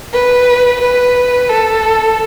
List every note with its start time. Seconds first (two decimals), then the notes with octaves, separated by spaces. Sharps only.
0.13 B4
0.80 B4
1.49 A4